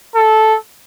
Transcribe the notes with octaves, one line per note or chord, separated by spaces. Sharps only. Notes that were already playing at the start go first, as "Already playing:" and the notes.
A4